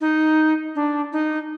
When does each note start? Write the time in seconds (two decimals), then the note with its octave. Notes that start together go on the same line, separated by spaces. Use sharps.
0.01 D#4
0.75 D4
1.13 D#4